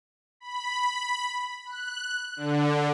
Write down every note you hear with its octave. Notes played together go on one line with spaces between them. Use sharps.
B5
F#6
D3